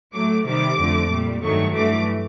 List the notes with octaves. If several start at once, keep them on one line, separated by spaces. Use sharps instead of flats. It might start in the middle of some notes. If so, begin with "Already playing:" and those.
A2 F#3 A3 D6
C3 D#3 G3 D6
F2 D3 F3 A3
A#2 G3
G2 D#3 F#3 A3 C#6
G2 E3 A3 D6